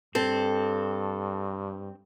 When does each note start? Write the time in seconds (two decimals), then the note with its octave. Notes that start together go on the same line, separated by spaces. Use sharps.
0.15 G2 C4 A4